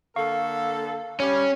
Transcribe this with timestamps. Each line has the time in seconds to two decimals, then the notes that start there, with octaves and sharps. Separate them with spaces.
0.16 D3 A#3 A4 F5 C#6
1.20 G3 C#4